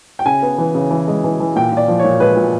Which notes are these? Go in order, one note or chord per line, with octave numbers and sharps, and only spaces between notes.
G5
C#3 G#5
B3
E3
C#3
E3
G#3
E3
E3
A#2 G5
A#2 D5
F3
A#2 C#5
G#3 B4
A#2